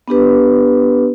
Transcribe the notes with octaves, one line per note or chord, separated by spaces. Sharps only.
B3 D4 G4 B4